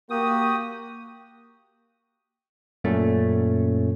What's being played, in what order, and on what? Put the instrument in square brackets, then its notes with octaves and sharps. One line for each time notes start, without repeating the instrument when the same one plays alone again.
[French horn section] A#3 [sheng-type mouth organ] F#4 G4 [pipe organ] D#6
[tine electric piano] F#2 A#2 A3 C#4